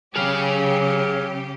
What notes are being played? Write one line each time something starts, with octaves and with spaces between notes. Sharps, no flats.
C#3 F#3 G4 G#4 F5